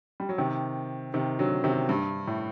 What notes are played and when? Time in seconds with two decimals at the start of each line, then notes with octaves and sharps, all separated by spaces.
0.20 G3
0.29 F#3
0.38 C3 D#3
1.14 C3 D#3
1.39 D3 F#3
1.64 C3 D#3
1.89 G2
2.27 A2